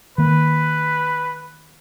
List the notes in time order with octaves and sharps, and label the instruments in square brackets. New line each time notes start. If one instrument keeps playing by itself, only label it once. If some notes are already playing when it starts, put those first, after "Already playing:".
[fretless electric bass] D#3 A#3 [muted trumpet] B4